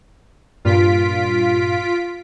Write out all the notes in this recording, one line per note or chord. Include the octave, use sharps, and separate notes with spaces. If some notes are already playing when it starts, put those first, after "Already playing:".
G2 A#2 F4 B6 D7